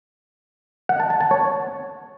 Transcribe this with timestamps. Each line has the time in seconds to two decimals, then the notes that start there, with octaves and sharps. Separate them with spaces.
0.89 F#5
1.00 A5
1.10 A5
1.21 A5
1.31 C#5